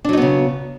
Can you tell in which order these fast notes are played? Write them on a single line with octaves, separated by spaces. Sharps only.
D4 F#3 D#4 B3 C#3